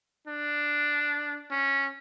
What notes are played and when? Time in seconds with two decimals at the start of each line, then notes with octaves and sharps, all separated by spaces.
0.27 D4
1.51 C#4